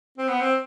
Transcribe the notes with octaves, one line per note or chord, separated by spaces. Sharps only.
C4
B3
C4